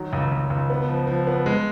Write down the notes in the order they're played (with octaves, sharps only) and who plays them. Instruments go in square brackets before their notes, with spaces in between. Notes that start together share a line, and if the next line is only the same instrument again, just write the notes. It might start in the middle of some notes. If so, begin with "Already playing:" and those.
Already playing: [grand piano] D#3 F#3
C#2
C#2
C#2
B3
F3
F3
B3
G#3